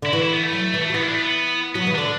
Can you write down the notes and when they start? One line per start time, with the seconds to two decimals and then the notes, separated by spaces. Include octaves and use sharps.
0.02 D3 E4
0.12 E3 F#4
0.22 E4
0.33 B3
0.43 A3
0.53 F#3
0.74 E3
0.82 A3
0.90 F#3
0.94 E3 B3
1.03 E4
1.08 D4
1.14 A3
1.21 B3
1.75 F#3 B3
1.87 E3
1.95 D3 D4